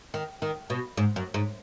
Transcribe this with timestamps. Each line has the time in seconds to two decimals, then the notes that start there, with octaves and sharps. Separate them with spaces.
0.14 D#3
0.42 D#3
0.70 B2
0.97 G#2
1.16 F#2
1.34 G#2